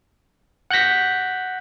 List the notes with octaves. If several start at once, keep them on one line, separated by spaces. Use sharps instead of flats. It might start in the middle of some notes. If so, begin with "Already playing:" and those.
F#5 F#6 G6 A#6 B6